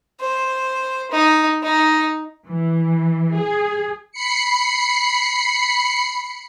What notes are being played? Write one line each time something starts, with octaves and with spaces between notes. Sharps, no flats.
C5
D#4
D#4
E3
G#4
B5 C7 C#7